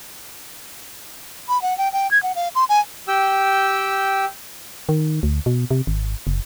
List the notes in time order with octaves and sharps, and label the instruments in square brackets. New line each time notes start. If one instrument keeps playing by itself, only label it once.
[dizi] B5
F#5
G5
G5
G#6
F#5
F5
C6
G#5
[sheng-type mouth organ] G4 G5 E6
[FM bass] D#3
D2
B2
C3
G#1
F#1